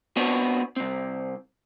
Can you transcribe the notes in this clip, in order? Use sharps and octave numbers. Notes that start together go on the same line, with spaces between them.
B3 C4 D4 F#4 B4 C#5
C2 C4